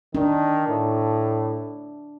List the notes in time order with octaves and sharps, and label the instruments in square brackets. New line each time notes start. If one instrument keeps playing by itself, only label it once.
[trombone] D#3 [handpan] D4
[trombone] A2